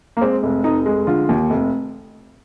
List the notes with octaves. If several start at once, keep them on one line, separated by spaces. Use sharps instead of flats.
A#3
G#3 C4
F1
F1 D#4
G#3
D3 F4
D#2
F1